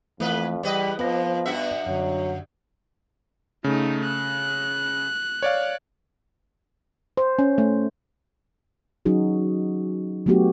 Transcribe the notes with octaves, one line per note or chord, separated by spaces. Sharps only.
F2 E3 A3 A#3 B4
E2 G3 B4 D5 D#5
F2 F3 B3 B4 A#6
G2 F#4 E5
F#2 D3 F#3
C#3 A3 D#4
F#6
C#5 D5 F5
C5
C#4
A3
F#3 C#4 D#4 F#4 G#4
F#3 A3 B3 D4 F#4 G4